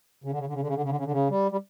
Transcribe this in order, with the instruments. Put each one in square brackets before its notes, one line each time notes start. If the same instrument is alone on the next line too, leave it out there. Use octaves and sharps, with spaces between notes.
[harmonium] C#3
D3
C#3
D3
C#3
D3
C#3
D3
C#3
D3
C#3
D3
C#3
G3
G3